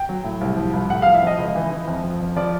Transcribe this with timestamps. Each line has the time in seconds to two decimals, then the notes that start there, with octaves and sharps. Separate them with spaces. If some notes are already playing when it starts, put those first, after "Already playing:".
Already playing: G5
0.09 F#3
0.24 A2
0.41 C2
0.57 F3
0.73 C2
0.90 A2 F#5
1.02 F3 F5
1.14 E5
1.23 F3 D#5
1.38 C#2
1.55 E3
1.71 E3
1.88 F2
2.03 F3
2.20 F2
2.36 F3 D5